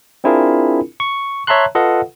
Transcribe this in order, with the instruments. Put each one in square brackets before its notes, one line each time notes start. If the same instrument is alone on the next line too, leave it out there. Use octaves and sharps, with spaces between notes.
[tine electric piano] C4 D4 E4 F4 G#4 A#4
C#6
C#5 E5 A5 A#5 C6 F#6
F4 A4 B4 D#5 F5 F#5